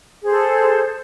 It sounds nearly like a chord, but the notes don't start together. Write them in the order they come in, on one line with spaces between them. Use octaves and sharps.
G#4 C5 A4